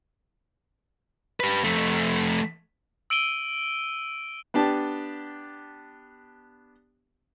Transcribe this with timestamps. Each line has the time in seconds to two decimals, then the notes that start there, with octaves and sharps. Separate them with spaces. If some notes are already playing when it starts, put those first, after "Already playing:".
1.40 G4 B4
1.64 F2 A3
3.10 E6 D7 D#7 G7
4.54 B3 D4 G4 A5